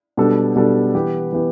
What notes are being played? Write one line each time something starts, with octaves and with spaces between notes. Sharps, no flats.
B2 G3 D4 A4
B2 G3 D4 A4
E3 B3 G4
E3 B3 G4